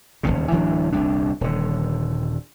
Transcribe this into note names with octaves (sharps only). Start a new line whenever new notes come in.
D#1 A#1 D#2 C#3
D1 E3 F#3 D4
D#1 C2 D4
D#1 D3